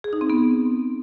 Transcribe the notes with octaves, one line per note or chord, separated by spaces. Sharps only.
G#4
D#4
C4
B3